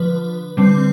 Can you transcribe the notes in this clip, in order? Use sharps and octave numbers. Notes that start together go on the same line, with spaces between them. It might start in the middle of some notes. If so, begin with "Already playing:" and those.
Already playing: D3 F3 B4
D3 G3 C4